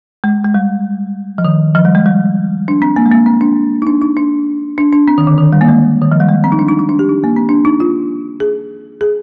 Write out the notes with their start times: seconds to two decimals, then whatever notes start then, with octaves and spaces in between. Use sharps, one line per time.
0.24 G#3
0.44 G#3
0.54 G3
1.38 F3
1.45 D#3
1.75 F3
1.85 G3
1.95 G#3
2.06 G3
2.68 D4
2.82 C4
2.96 A#3
3.06 G#3
3.11 A#3
3.26 C4
3.41 D4
3.82 D#4
3.87 D4
4.02 D#4
4.17 D4
4.78 D4
4.92 D4
5.08 C4
5.18 D#3
5.27 D3
5.38 D#3
5.53 G3
5.61 A#3
5.68 G#3
6.02 D#3
6.12 F3
6.20 G3
6.29 G#3
6.44 C4
6.52 D#4
6.59 D4
6.69 D#4
6.79 D#4
6.89 D4
6.99 G4
7.09 D#4
7.24 A#3
7.36 C4
7.49 D4
7.65 D#4
7.80 F4
8.40 G#4
9.01 G#4